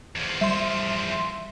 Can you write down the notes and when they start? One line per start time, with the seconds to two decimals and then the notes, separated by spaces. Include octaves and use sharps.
0.16 E2 F3
0.41 G3 E5 C6